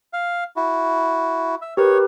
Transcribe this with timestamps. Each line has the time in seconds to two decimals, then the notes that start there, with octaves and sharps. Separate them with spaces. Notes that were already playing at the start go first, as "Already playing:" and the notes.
0.13 F5
0.56 E4 F#4
1.62 E5
1.77 G4 A#4 B4 C#5